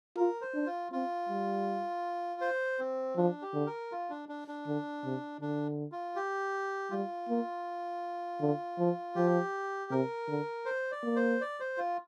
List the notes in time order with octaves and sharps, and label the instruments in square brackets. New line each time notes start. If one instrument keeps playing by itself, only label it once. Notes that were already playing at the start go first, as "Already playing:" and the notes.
[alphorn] F4 [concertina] A#4
[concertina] C5
[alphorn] D4
[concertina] F4
[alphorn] C4 [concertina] F4
[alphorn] G3
[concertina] C5
C4
[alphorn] F3 [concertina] D4
[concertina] G4
[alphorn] D3
[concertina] A#4
F4
D4
D4
D4
[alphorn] D3
C3
[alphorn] D3 [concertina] D4
[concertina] F4
G4
[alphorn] G3 [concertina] F4
[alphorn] A#3
D3
F3
[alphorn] F3 [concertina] G4
[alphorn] C3 [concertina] A#4
[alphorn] D3
[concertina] C5
D5
[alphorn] A#3
[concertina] C5
D5
C5
F4